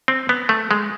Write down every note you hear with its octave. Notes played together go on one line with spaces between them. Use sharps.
C4
B3
A3
G#3